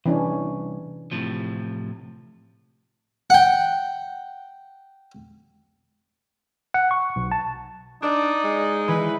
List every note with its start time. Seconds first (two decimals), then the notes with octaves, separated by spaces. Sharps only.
0.06 C2 E3 C#4 D4
1.12 A2 C3 F3
3.30 F#5 G5
6.74 F#5
6.91 C#6
7.16 B1
7.32 A5
8.02 D4 D#4 D5
8.44 G#3
8.88 E3 B4